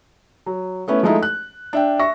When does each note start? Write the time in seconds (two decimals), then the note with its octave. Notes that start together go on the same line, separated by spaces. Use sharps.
0.46 F#3
0.88 A3 B3 C#4 E4
1.03 F3 G#3 A3 D#4 E4 A4
1.22 F#6
1.73 D4 E5 G5
2.00 E5 C#6 A#6